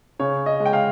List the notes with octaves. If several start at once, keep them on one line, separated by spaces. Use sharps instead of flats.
C#3 C#5
D#5
G#3
G5
F5